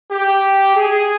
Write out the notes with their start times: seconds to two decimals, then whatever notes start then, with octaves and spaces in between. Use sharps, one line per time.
0.11 G4
0.76 G#4